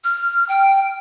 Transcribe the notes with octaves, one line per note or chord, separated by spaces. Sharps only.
F6
G5